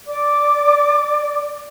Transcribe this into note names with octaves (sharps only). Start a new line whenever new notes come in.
D5 D6